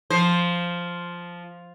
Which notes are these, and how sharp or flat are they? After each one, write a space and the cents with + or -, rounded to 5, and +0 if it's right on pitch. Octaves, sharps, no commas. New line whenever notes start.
F3 +0 C5 +0